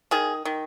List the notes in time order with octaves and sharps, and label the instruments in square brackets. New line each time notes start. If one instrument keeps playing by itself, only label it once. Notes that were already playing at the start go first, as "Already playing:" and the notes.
[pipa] D#3 G#4
D#3